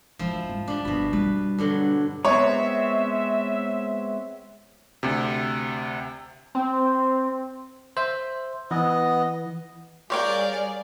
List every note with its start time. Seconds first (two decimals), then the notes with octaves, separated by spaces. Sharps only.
0.19 G#1 F3 E4
0.49 G#2 C#4
0.68 G3 D4
0.85 G1 B2 B5
1.13 G3 B3 B4
1.59 G2 D3 F#3
2.25 G#3 B3 C4 C#5 E5
5.03 D2 C3
6.55 C4
7.97 C5 E5
8.71 E3 B3 D#5
10.10 G3 G4 G#4 A#4 C#5 D5 F5 G5